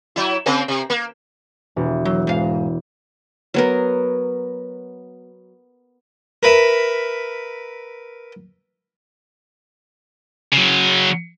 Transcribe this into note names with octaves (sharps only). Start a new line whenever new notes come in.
F#3 E4
C#3 A#3 C4
C3
A#3
E1
F#3
G#2 F5
F#3 B3 A#4
A#4 B4 E5
C#3 F#3